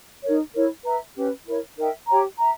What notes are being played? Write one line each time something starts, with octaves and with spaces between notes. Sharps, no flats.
D#4 A#4 C#5
E4 A#4 C#5
B4 E5 A#5
C#4 G4 B4
E4 A#4 C#5
D#4 A#4 E5 G5
G4 C#5 G5 A#5
E5 A#5